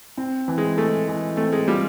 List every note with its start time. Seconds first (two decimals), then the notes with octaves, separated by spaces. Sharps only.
0.17 C4
0.48 E3
0.58 G#3
0.77 G#3 A3
1.08 E3
1.37 A3 C4
1.53 G#3
1.67 G3 F4